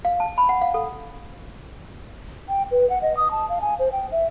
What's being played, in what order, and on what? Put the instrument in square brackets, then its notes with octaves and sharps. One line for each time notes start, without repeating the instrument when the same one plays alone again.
[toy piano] F5
A5
B5
F#5
F5
A4
[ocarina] G5
B4
F#5
D#5
D#6
A5
F5
G#5
C5
G5
E5